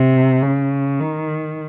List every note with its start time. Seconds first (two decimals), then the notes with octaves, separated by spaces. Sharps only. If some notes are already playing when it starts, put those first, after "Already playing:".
Already playing: C3
0.42 C#3
1.00 D#3